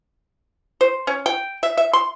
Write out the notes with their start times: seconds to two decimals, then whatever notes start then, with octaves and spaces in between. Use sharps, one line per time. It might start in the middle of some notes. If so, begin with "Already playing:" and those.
0.81 C5
1.07 C#4
1.26 G5
1.63 E5
1.77 E5
1.93 C6